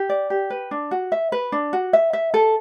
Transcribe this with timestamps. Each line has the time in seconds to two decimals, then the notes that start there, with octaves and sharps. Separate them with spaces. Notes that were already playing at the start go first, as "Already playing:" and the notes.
Already playing: G4
0.09 D5
0.30 G4
0.50 B4
0.71 D4
0.91 F#4
1.12 E5
1.32 B4
1.52 D4
1.73 F#4
1.93 E5
2.13 E5
2.34 A4